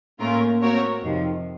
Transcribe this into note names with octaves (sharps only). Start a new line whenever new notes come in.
A2 A3 A#3 C#4 F4 A#4
A3 C4 F#4 A#4 C#5
F2 C3 D#3 F3